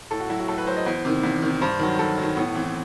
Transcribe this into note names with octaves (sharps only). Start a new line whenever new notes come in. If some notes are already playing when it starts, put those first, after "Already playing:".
A2 A4
F#4
F#3 E4
F#4
A2 A4
B4
F#3 C5
D#5
E2 C5
C3 D#3
E2
C3 D#3
G2 C5
D#3 F#3
G2 A4
D#3 F#3
A2 B3
E3 C4